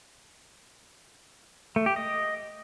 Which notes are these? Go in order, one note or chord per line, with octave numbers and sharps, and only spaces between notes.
A3
G4
D#5